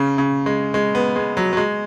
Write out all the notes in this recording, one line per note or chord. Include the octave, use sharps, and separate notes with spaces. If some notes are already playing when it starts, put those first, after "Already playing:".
Already playing: C#3
C#3
G#3
G#3
B3
G#3
F#3
F#3
G#3